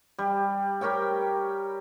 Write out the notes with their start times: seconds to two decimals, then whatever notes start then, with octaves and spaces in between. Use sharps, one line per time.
0.18 G3
0.81 G4 A#4 C#5 G5